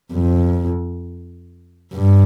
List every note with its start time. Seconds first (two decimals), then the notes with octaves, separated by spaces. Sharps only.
0.13 F2
1.93 G2